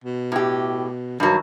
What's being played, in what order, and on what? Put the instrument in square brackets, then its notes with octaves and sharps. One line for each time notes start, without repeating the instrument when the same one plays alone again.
[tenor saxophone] B2
[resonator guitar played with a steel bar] A2 G4
[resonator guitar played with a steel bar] G2 F#3 [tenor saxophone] D#3